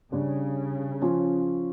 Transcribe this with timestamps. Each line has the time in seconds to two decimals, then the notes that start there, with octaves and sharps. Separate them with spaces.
0.12 C#3 G3 D4 G4 C#5
1.02 F3 C#4 F4